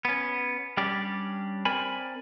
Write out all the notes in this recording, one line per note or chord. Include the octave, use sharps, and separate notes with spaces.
B3 C#4
G3 C#4 D4 G4 D5
C4 A#4 D5 G#5 B5